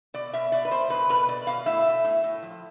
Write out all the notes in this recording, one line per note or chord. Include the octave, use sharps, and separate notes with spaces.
B2 D5
B2 E5
B2 D5
B4
B2 C5
B2 B4
B2 B4
B2 D5
B2 F5
A2 E5
A2
A2
A2
F3